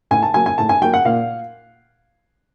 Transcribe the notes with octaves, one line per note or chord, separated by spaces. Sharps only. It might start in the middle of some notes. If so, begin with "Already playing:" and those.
A2 G#5
A5
F#3 A#3 G#5
G#5
A2 A5
G#5
F#3 A#3 G5
F#5
A#2 F5